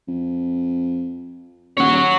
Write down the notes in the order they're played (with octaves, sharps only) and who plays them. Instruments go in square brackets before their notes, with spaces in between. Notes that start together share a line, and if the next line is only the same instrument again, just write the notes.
[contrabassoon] F2
[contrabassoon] D#1 [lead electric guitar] C#5 F#5